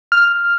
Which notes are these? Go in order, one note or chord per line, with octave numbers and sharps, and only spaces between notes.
F6